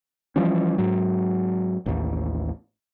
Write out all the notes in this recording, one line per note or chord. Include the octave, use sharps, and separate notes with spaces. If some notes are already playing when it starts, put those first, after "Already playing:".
E3 F3 G3 C#4
G#2 F#3
A1 D#2